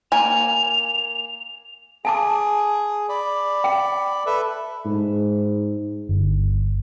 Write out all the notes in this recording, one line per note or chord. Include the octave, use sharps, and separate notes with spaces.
A#3 G#5 F7
G#4 G#5 A5 D6
D5 B5
G5
A4 B4 E5
G#2
G1